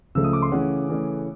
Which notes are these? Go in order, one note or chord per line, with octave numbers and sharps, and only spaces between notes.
C#2 C#3 F3 A3 E6
D#6
D6
C6
C#3 E3 A3 C#4 F#5
C#3 E3 A3 C#4